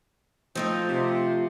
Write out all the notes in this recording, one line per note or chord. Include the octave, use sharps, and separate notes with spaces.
F3 A3 C4 D#4 F4
C3